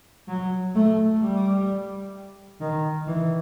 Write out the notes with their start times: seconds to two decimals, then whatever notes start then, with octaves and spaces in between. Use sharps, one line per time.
0.28 F#3
0.75 A3
1.21 G3
2.61 D#3
3.07 E3